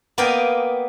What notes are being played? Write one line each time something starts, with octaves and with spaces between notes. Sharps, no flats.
A#3 B3 D5 D#5 F5 G5